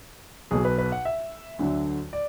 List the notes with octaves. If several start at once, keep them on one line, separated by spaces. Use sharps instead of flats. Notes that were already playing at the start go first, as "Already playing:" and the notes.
B1 B2 F#3 G#4
B4
B4
F#5
E5
D2 D3 F#3
D5